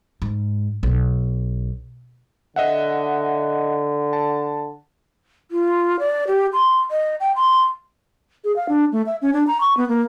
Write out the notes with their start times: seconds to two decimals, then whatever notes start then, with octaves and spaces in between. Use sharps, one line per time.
0.22 G#2
0.83 B1
2.56 D3 D#5 E5 F#5
4.13 A5
5.51 F4
5.99 D5
6.27 G4
6.53 C6
6.91 D#5
7.20 G5
7.36 C6
8.44 G#4
8.56 F5
8.69 D4
8.92 A3
9.06 E5
9.22 C#4
9.33 D4
9.47 A#5
9.60 C#6
9.77 B3
9.89 A#3